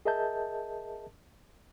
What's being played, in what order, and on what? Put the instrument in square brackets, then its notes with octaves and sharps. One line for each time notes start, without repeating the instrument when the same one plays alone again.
[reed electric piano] G#4 A#4 D#5 E5 A5 G6